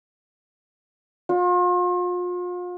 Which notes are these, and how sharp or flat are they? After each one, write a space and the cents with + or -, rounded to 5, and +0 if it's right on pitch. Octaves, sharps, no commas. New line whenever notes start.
F4 +40